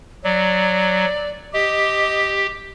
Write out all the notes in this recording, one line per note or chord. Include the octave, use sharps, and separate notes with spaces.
F#3 D5
G4 D#5